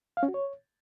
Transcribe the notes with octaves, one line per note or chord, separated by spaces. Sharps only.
F5
C#4
F#4
C#5